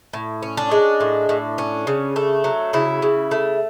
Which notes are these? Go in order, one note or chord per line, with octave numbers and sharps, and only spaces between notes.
A2
C#4
D4
G#3
A2
A2
C#4
C#3
A3
F#3
C#3 E4
C#3
A3